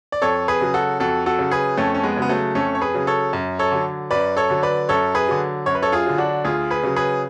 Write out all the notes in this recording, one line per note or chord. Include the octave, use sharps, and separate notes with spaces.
D5
F2 A4 C#5
G#4 B4
C#3 F#3
F#4 A4
F2 F#4 A4
F#4 A4
C#3 F#3
G#4 B4
F2 A3 C#4
C#4
G#3 B3
C#3 F#3 B3
F#3 A3
F2 A3 C#4
C#5
G#4 B4
C#3 F#3
A4 C#5
F#2
A4 C#5
D3 F#3
F#2 B4 D5
A4 C#5
D3 F#3
B4 D5
F#2 A4 C#5
G#4 B4
D3 F#3
F#2 C#5
B4
A4 C#5
F4 G#4
D3 F#3
D4 F#4
D2 F4 G#4
G#4 B4
C#3 F#3
G#4 B4